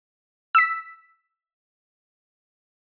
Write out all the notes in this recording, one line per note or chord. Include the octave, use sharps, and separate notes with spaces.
E6 B6